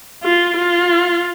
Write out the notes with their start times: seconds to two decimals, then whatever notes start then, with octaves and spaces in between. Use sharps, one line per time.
0.23 F4
0.56 F4